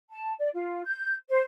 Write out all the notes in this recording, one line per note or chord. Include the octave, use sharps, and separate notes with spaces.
A5
D5
F4
G6
C5